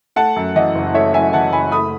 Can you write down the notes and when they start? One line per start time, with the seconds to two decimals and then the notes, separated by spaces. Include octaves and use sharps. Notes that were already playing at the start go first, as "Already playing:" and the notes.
0.16 A3 F#5 A5
0.36 F#2
0.55 E3 D#5 F#5
0.75 F#1
0.94 A3 C#5 E5
1.14 F#2 E5 G#5
1.33 E3 F#5 A5
1.53 F#1 G#5 B5
1.72 A3 B5 D#6